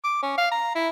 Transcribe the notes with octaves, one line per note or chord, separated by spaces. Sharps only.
D6
C#4
F5
A#5
E4